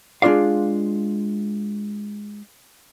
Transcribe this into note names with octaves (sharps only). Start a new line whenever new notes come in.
G#3 D4 F4 D5 F5